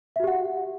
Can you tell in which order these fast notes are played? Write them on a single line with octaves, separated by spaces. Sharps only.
E5 F#4 G4 F#5